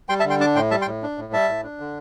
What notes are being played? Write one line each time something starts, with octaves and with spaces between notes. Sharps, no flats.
G3 G5 C6
E5 A5
D3
G5 C6
D4 A5 D6
A2 G5 C6
G3 E5 A5
G5 C6
A2
D4
A2
G3 E5 A5
A2
D4
D3